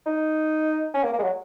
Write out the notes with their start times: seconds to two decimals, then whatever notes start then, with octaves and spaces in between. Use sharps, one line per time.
0.06 D#4
0.94 C#4
1.03 A#3
1.13 A#3
1.19 G#3
1.23 F#3